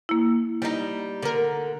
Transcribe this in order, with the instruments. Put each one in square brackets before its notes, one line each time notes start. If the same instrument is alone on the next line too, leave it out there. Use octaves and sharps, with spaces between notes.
[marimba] A#3 E4
[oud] G3 D#4
D3 A#4